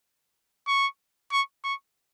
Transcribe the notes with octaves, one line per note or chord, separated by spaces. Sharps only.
C#6
C#6
C#6